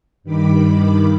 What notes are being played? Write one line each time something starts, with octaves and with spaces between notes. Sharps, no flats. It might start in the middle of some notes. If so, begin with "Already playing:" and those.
G2 D#3 B5 D6